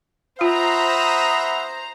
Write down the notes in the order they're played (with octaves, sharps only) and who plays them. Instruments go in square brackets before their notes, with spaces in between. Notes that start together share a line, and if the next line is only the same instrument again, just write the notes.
[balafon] F4 [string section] C5 A#5 [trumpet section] E5 F#5 B5 [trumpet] D#6